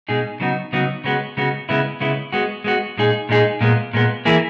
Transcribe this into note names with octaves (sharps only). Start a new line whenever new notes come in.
B2 G#3 D#4 G#4
C#3 F#3 B3 D#4 F#4
C#3 F#3 B3 D#4 F#4
C#3 G#3 B3 F#4
C#3 G#3 B3 F#4
C#3 G#3 B3 E4
C#3 G#3 B3 E4
G#3 B3 F#4
G#3 B3 F#4
A#2 G#3 D#4 G#4
A#2 G#3 D#4 G#4
A#2 G#3 B3
A#2 G#3 B3
E3 A#3 E4 G#4